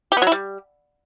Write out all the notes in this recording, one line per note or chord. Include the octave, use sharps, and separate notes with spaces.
G4
B3
F#3
E4
G3